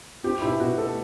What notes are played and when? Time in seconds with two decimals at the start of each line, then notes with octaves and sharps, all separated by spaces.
0.23 C4 G4
0.42 B2 E4
0.60 B2 F#4
0.78 A3 A4